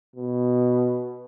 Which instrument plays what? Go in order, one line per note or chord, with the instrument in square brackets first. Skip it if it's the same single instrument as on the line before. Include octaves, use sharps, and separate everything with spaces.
[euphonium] B2